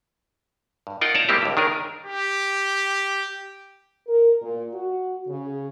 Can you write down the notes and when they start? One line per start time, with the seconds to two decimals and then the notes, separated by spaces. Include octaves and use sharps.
0.87 G2
1.01 D#4 F4 A#4 F#5 G5
1.14 C#5 D5 F5 A5 A#5
1.29 G3 G#3 A#3 C4 E4 G4
1.42 C#2 G2
1.57 D#3 D4 G#4 A#4
2.06 G4
4.07 A#4
4.42 A#2
4.74 F#4
5.28 C#3